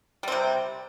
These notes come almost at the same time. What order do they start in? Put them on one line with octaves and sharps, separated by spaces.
G3 C4 C3